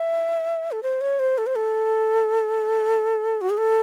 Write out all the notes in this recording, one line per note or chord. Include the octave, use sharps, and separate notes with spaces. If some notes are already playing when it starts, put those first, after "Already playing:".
Already playing: E5
A4
C5
C#5
C5
A4
C5
A4
F#4
G#4
A4